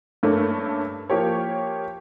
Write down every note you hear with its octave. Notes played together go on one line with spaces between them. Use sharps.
G2 A3 A#3 C#4 D4
F3 A#3 G4 C#5